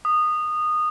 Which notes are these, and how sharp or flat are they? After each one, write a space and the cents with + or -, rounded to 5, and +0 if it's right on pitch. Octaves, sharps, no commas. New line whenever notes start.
D#6 -20